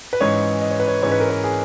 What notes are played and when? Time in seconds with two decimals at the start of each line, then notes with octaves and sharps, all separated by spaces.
0.13 B4
0.20 G#2 E3 G#3 C#4 C#5
0.62 D#5
0.71 C#5
0.80 B4
0.88 C#5
1.02 G#2 E3 G#3 C#4 C#5
1.12 B4
1.20 A#4
1.30 B4
1.44 G#4